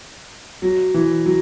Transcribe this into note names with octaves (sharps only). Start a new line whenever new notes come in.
F#3
E3
F#3